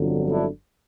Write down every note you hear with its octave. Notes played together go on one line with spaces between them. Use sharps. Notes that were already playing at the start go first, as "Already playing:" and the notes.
Already playing: G1 F2 D3 F#3
D4 E4